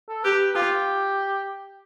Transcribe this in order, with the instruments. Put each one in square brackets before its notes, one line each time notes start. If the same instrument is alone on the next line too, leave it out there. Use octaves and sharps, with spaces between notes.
[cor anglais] A4
[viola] G4 [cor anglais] B4
[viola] F4 [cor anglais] G4